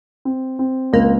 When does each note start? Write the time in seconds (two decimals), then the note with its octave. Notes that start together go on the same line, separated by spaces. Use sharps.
0.25 C4
0.59 C4
0.93 C#2 A#3